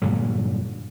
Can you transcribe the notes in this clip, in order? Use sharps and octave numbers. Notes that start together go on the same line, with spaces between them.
G2 A#2 D3 F#3